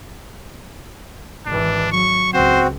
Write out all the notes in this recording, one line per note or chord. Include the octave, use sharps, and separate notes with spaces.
G#1 E3 D4
F#3 C#6
C#2 C4 F#4 C5